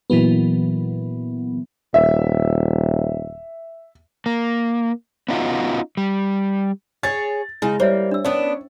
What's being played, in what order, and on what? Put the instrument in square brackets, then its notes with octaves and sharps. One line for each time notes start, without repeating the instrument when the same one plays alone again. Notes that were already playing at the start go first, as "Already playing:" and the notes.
[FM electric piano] A#2 E3 F#3 B3
[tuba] D#1 [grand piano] E5
[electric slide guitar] A#3
B3 C#4 D#4 F4 F#4
G3
[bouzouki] G#4 C#5 [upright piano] A6
[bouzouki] C#3 D#4 [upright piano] G#3 [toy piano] E4
[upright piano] G3 [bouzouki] A#3 [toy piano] C5 C#5 E5
[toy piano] D4 E6
[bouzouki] B3 D4 [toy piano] C#4 [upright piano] C#5